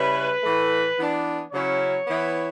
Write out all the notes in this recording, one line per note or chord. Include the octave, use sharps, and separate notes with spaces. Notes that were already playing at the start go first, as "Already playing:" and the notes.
Already playing: C#3 G3 C#4 E4 B4
A2 E3 A3
E3 B3 D4
C#3 F#3 C#4 E4 C#5
E3 B3 E4